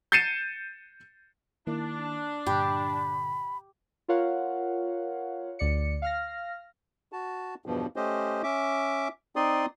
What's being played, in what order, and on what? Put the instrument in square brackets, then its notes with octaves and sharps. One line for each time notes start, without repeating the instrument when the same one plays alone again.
[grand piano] G6 A6 C7 C#7 D#7 E7
[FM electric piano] D#3 A#3 E4 [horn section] D4
[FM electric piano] G2 A#2 D3 [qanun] G4 [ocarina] B5
[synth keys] F4 A#4 C#5 F5 F#5
D2 D5 C#7
F5 F6 A#6
[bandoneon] F#4 A5
E2 G2 B2 F3
A3 C#4 G4 C5 D#5
C#4 E5 D6
C4 D#4 D5 C6 D#6